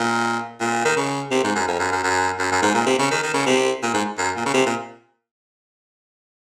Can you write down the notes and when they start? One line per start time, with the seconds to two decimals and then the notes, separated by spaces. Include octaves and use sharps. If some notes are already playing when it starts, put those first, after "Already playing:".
Already playing: A#2
0.60 A#2
0.85 D#3
0.96 C#3
1.31 C3
1.44 G#2
1.55 F#2
1.67 F2
1.79 F#2
1.92 F#2
2.04 F#2
2.39 F#2
2.51 F#2
2.62 G#2
2.74 A#2
2.86 C3
2.99 C#3
3.11 D#3
3.23 D#3
3.34 C#3
3.46 C3
3.83 A#2
3.94 G#2
4.18 F#2
4.36 A#2
4.46 C#3
4.54 C3
4.66 A#2